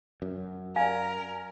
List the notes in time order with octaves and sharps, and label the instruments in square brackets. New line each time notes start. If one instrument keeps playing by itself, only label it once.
[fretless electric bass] F#2
[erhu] A#4 [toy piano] D5 F5 [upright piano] G#5